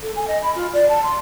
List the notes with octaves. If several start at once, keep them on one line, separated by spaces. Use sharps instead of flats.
A4
G#5
D#5
B5
F4
D5
A5
C6